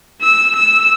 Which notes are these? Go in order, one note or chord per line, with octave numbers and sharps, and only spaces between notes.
E6
E6